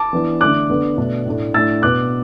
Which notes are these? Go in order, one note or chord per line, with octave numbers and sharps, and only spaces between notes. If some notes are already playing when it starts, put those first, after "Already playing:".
Already playing: A5 D6
E3 B3 D4
D3 A3 D4 D6 F#6
D3 B3 D4
B2 A3 D4
A2 A3 D4
A2 A3 D4 E6 A6
B2 B3 D4 D6 F#6